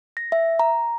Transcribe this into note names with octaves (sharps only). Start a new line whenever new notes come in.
A#6
E5
A#5